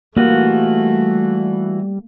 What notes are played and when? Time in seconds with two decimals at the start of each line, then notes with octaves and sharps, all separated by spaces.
0.17 E3 G3 A3 A#3 F4 F#4